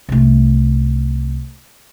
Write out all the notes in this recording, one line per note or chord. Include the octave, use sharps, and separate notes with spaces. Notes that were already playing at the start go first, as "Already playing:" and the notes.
C2 A3